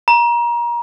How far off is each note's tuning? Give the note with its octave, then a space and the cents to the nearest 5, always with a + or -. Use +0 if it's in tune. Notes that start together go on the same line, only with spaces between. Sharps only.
A#5 +30